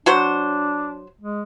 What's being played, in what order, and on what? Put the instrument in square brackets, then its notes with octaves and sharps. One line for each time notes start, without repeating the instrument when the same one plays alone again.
[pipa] F#3 F#4 C5 [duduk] D4
[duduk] G#3